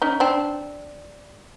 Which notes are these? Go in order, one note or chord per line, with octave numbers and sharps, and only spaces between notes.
C#4 D#4
C4 D4